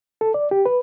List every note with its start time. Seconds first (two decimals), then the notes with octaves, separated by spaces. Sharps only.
0.21 A4
0.34 D5
0.51 G4
0.66 B4